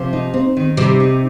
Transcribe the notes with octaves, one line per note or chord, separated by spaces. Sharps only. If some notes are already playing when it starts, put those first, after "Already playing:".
Already playing: C3 F3
D#4
C4
D#3
C3 G3
D#4